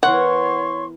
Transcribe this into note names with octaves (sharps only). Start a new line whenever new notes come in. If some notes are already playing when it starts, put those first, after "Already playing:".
E3 B3 A#4 C#5 F#5 C6 C#6